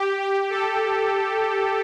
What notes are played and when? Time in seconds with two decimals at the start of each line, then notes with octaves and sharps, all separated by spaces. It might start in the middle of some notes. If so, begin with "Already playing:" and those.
Already playing: G4
0.22 G4
0.50 A4